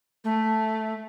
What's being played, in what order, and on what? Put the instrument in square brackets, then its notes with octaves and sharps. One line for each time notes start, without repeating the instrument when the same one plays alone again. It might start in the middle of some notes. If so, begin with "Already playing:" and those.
[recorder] A3